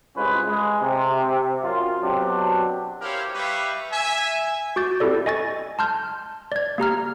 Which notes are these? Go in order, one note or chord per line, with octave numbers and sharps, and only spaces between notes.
C2 G#3 C#4 F4 B4
G#3
C3
F#2 F4
B2 F#3 C4 D4 G4
E4 G4 A#4 C5 C#5 F5
G3 G4 B4 E5 F5 C#6
E5 G#5
F#4 D6 G6 A6
C4 E4 G4 A4 D5
D#5 G#5 C#6 A6
A5 C6 F6 G6
D5 G#6
A#3 G4 A#5 F6